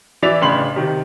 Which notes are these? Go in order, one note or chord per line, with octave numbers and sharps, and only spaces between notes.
E3 D5 E5 A6 B6 F7
A1 C#3 D4 B5 C6 F#7
C3 D#3